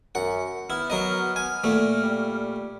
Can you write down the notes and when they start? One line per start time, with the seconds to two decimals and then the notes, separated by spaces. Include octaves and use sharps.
0.15 F#2 F#5
0.70 B3 E4 F6
0.90 F#3 A#4 D#5
1.36 G#5
1.64 A#2 A3
2.03 G3